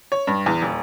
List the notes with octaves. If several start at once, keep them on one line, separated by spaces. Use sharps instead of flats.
C#5
G2
E2
D#1